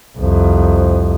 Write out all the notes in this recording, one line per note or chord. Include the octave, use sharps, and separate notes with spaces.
C2 F2